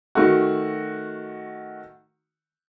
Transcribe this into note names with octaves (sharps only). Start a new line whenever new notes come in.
D#3 A3 F#4